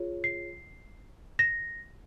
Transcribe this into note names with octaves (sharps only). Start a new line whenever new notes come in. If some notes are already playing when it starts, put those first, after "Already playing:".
Already playing: F4 G#4 C#5
C7
A#6